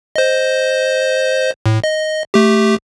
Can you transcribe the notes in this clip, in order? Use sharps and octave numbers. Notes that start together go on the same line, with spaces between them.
C5 D#5
A2
D#5
A3 G4